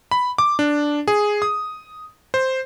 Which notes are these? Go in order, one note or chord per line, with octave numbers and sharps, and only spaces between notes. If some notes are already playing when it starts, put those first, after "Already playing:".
B5
D6
D4
G#4
D#6
C5